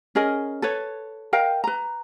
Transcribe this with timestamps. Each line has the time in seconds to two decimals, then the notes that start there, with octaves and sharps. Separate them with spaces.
0.15 C#4 G#4 A#4 D#5
0.62 A4 B4 C#5
1.33 A#4 D#5 F5 G5
1.64 B4 A#5